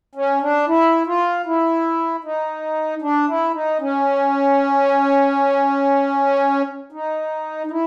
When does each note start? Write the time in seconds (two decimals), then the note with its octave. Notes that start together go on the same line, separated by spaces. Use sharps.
0.15 C#4
0.42 D4
0.68 E4
1.07 F4
1.46 E4
2.24 D#4
3.02 D4
3.29 E4
3.54 D#4
3.81 C#4
6.92 D#4
7.67 D#4
7.71 E4